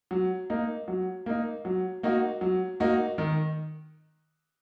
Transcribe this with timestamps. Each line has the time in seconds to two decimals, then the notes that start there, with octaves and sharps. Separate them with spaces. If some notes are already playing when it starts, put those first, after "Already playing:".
0.11 F#3
0.50 A#3 D#4
0.88 F#3
1.26 A#3 D#4
1.65 F#3
2.03 A#3 D#4 F#4
2.41 F#3
2.80 A#3 D#4 F#4
3.18 D#3